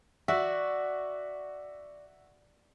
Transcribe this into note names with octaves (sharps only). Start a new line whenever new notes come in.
F#4 D5 E5